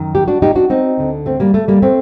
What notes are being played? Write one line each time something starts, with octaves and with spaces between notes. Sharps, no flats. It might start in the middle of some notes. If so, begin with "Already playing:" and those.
Already playing: F#2 D#3
G4
D4 F#4
D#4 G4
D4 F#4
C4 D#4
D2 D3
A3 C4
G3 A#3
A3
G3 A#3
A3 C4